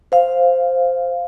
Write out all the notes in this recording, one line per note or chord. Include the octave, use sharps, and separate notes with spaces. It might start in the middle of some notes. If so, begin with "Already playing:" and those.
C5 F5